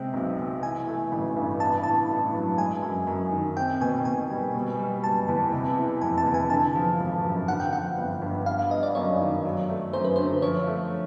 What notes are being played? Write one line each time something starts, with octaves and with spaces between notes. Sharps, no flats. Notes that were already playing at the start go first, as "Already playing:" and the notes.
Already playing: C3 G#3 C4 G5
B1
B2
E3 G#5
A3
A1
G2
B3 A5
A2 A5
A2
F#3
G#3 G#5
F#2
F#2
D#3
C4 G5
B2 G#5
B2 G#5
G3
B2
G3
F#1 A5
E2
C3
E3
F1 G#5
A5
E2
G#5
D3 A5
F3
G#1
F#2
D3 F#5
G5
F3 F#5
G1
G2
G3 F5
F5
B3 D#5
D5
F#2 C#5
D#3
F#3
A3
F#2 C5
B4
D3 C5
F3 C#5
A3